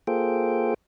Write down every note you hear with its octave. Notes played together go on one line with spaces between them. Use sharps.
A#3 F4 G#4 A4 C5 G5